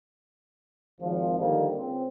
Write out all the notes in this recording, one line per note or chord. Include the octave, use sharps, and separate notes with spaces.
G#1 F3
D3 D#3 F3 G3 A#3
C#2 C4